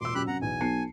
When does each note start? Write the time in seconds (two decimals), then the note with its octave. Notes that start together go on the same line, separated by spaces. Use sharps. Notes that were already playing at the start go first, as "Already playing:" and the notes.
0.01 E1 A#2 C6 D6 E6
0.15 F#2 G4 B5 F#6
0.27 C3 F#5 A#5
0.42 B1 E2 G#5
0.61 B1 A5 C7 C#7